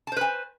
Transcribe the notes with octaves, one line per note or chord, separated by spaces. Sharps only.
B4 C5 G#5 A5